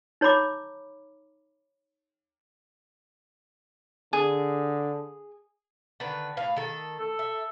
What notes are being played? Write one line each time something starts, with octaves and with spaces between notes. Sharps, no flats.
D#4 C#5 A#5 B5 D6
D3 G#4
D3 D#3 B4
A2 B4 F5
D#3 A4
A4
E5